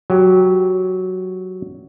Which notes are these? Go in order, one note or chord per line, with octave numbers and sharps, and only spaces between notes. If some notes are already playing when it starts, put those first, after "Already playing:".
F#3 G4